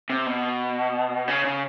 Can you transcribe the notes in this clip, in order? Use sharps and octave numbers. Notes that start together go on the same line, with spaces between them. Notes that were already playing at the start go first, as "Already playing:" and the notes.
C3
B2
C#3
C#3